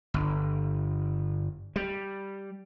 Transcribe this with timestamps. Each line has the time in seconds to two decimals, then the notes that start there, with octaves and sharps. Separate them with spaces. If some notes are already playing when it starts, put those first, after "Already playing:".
0.14 G1
1.76 G3